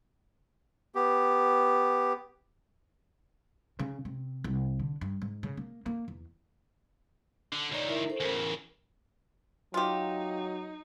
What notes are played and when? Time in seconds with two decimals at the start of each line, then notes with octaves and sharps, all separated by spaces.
0.95 B3 G4
3.79 C#3
4.05 C3
4.44 C2
4.80 D3
5.01 G2
5.22 G#2
5.43 C#3
5.57 A#3
5.86 A#3
6.08 E2
7.53 D3
7.72 C#2 D#3 C#5 D5
7.86 E4 A#4 E5
8.08 A4 C5
8.20 E2 C#3 A#4
9.74 F#3 D#4 F4 G4